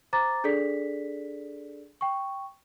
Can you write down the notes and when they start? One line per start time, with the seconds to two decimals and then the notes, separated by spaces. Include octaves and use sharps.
0.13 C5 A#5 D6 A6
0.44 D4 G#4 A4 D5 B6
2.01 G5 C#6